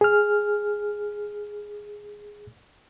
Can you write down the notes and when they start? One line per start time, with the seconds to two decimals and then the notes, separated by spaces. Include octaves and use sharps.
0.01 G#4 F6